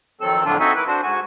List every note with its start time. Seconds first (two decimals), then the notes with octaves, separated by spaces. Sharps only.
0.21 F2 D#3 F#3 C4 A4 E6
0.45 F2 A2 D3 F#3 D4 F4
0.60 C4 D#4 F#4 A4 E5 G#5
0.75 A#3 E4 B4
0.87 D4 F#4 C5
1.02 G#2 F#4 G#5